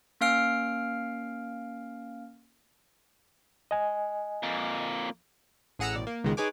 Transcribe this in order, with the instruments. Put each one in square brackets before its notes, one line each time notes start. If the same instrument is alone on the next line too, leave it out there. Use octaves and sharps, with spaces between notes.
[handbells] A#3 C#4 F5 F6 C7 D7
[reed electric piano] D#5 G#5
[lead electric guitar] F2 A#3
[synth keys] A1 G#4 F#5 A#5 E6
A1 B2 D5
A#3
C#2 B2 D#3 G#3
D#4 G#4 B4 C#5 G#5 D6